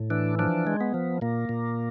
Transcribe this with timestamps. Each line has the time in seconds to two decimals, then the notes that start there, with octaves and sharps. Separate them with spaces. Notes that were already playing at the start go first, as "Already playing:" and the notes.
Already playing: A2
0.10 E3 D4
0.39 F3 D4
0.67 G#3
0.81 B3
0.94 F3
1.21 A#2 A#3
1.49 A#2